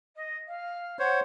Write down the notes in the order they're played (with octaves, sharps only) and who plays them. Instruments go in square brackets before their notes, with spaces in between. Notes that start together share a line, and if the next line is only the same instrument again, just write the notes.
[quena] D#5
F5
[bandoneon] C5 C#5 [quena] F#5